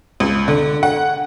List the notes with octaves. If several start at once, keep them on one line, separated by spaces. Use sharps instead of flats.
C#2
D3
F#5